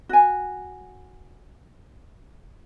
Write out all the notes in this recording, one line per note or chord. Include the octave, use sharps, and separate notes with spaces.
F#4 G#5